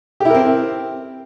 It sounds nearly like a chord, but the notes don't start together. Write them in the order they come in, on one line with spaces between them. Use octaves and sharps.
G4 E4 A#4 C4